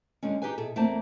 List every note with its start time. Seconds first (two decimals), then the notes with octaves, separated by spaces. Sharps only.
0.23 D3 G3 G#3 C#4
0.42 D#4 G4 G#4 B4 G#5
0.58 B2 E4 G#4 A4
0.76 E2 A3 A#3 C4 C5 A5